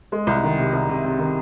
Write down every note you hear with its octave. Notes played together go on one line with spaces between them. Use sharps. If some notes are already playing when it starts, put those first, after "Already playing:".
G#3
C2
D#3
C3
C2
C3
C3
D#3